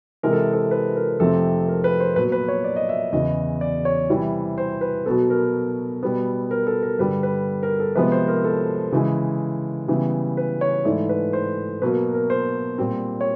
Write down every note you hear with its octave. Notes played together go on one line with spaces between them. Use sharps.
C3 E3 G#3 A#4
A4
A4
B4
A#4
F2 C3 F3 A3 C4 A4
A#4
B4
C5
A#2 F#3 B3 B4
B4
C#5
D5
D#5
E5
E2 C#3 E3 D#5
D5
C#5
C3 E3 G3
C5
B4
B2 F#3 B3 A4
A#4
B2 G3 B3
A#4
A4
A#4
G2 D3 G3 B4
B4
A#4
A4
C3 F3 G#3 B3 B4
C5
A#4
A4
C#3 E3 G#3
C#3 E3 G3 B3
B4
C#5
G#2 E3 A3 D5
B4
C5
B2 F#3 A#3 B4
A#4
C5
A#2 G3 C4
C#5